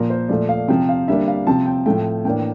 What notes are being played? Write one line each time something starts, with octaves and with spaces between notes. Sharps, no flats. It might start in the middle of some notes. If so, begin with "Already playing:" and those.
Already playing: A#2 F3 A#3 A#4
C5
A#2 F3 A3 D5
F5
C3 F3 C4 G5
F5
D3 G3 A#3 D4 E5
F5
C3 F3 C4 A5
G5
A2 F3 A3 G5
A2 E3 A#3 D4 G5